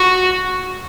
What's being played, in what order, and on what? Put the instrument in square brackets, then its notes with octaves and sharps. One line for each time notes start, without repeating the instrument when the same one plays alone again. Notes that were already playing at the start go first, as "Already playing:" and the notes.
Already playing: [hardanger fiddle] F#4